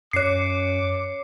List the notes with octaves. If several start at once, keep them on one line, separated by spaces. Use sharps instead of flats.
F#2 C#5 D6 C7 C#7